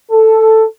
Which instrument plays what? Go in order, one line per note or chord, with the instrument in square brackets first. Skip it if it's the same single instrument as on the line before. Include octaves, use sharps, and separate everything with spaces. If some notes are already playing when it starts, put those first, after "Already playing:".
[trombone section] A4